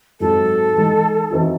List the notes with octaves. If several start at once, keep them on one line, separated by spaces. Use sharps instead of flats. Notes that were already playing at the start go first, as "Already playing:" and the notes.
G#2 F#3 C4 F#4 A4
E3 G#3 D#4
E3 C4 D#4 F#4